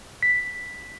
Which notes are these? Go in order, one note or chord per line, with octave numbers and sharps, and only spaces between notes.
B6